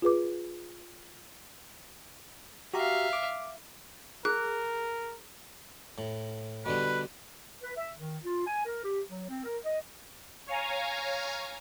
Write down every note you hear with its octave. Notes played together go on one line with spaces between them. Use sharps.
F4 G#4 B4 D6
F#4 G4 E5 F5 A#5
D6
G#4 A#4 F#6
A2
B2 D3 G3 B4
B4
E5
D#3
F4
G#5
A#4
G4
F#3
C4
A#4
D#5
C#5 F5 G#5 A#5